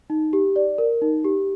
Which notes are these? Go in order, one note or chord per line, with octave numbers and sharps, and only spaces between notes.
D#4
G4
D5
A#4
D#4
G4